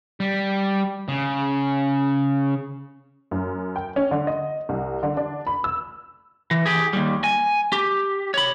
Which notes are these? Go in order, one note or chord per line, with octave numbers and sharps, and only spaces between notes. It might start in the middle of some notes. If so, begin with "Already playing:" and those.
G3
C#3
F#2
G5
C#4
D3
D#5
C2
D3
D4
B5
E6
E3
G4 G#4
D#2 G3
G#5
G4
C#5 B5